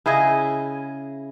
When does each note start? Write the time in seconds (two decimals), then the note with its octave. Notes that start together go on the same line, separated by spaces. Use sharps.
0.06 C#3 E4 G#4 D#5